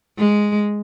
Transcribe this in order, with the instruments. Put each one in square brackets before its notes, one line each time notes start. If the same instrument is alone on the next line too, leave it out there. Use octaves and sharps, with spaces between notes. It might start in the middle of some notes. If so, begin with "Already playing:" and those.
[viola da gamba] G#3